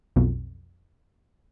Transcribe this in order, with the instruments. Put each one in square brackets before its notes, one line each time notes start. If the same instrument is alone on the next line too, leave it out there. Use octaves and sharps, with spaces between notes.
[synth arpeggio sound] B1 F2 B2